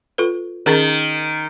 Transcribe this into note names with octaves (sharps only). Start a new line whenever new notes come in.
F4 A4 B4
D#3 C#4 G#4 A#4